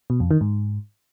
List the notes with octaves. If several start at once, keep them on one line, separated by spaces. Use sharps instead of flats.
B2
F2
D#3
G#2